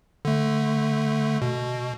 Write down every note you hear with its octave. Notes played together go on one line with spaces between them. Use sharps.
D3 A3
B2